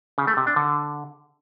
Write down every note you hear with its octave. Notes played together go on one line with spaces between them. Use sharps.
C#3
A3
C3
D4
D3